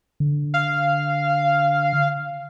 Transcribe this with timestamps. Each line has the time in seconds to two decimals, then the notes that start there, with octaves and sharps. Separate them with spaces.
0.20 D3
0.54 F5